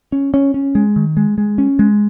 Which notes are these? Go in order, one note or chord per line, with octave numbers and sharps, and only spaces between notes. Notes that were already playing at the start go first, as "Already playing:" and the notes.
C#4
C#4
C#4
G#3
D#3
G#3
G#3
C#4
G#3